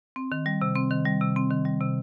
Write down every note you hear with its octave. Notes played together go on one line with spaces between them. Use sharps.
C4
D#3
G3
C3
C4
D#3
G3
C3
C4
D#3
G3
C3